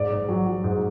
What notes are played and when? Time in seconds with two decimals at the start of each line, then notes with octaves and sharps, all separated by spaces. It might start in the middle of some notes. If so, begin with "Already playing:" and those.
Already playing: G#2 D5
0.11 G#2
0.29 F#3
0.47 F#3
0.64 G#2